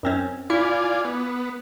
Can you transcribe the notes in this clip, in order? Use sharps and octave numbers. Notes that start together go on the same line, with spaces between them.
F#2 C4 C#4
E4 F4 D5 G#5
B3